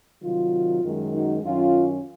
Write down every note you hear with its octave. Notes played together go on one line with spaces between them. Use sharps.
C3 D#3 F#3 F4
F#2 D#3 G#3
D#4 F#4
F#2 D#3 F#3 C#4 F4